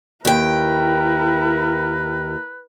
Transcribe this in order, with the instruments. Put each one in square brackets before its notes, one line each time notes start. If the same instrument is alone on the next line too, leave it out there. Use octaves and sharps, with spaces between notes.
[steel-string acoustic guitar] D#2 G5 [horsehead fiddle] E4 A#4 [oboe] B4